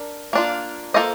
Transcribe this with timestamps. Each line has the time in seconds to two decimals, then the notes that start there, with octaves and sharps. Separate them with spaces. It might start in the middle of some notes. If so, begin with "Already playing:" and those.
Already playing: D4 A#4
0.33 A#3 D4 F4
0.94 A#3 F4 A4 C5 D#5